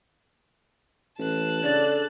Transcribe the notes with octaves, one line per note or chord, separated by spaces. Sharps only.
A1 A5 F#6
C#3 D4 A4 D5